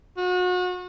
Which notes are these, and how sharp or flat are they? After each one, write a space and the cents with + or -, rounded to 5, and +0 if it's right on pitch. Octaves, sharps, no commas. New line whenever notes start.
F#4 -35